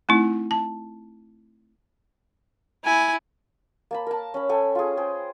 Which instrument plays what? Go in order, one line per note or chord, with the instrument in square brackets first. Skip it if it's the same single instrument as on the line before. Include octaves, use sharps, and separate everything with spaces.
[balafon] A3 C4 D#4 E4
A5
[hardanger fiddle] E4 [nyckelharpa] G#5
[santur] A#3 A5 B5
A#4 A5
C#4 B5
A4 G5 G#5
F4 G#4
G#4 C5 G5